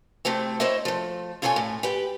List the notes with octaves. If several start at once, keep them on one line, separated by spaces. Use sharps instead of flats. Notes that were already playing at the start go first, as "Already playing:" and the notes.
A2 C3 A3 C4
E4 C5 C#5 D#5 E5
F3 A3
A#2 F4 A4 C#5 D5 G#5
A2
G4 B4 G5